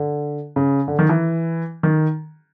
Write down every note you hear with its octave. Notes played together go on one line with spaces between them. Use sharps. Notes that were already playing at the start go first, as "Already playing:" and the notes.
Already playing: D3
C#3
D3
D#3
E3
D#3